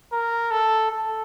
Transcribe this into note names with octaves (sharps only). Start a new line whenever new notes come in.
A#4
A4
A4